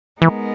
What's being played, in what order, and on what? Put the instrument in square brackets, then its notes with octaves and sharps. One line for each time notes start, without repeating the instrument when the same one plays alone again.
[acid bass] E3 [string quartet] G#3 B3 D#4 A#4